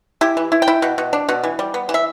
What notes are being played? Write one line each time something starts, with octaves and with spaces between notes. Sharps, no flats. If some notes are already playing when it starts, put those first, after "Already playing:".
E4 G4
E3
E4
G5
E4
B2
B2
D4
B2
E3
G3
B3
E3
E5